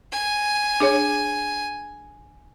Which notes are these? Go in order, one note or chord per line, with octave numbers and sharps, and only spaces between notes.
G#5
D4 G#4 C#5